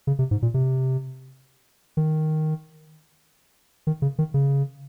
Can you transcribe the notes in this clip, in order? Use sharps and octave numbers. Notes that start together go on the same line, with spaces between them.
C#3
C3
G#2
A#2
C3
D#3
D#3
C#3
D#3
C#3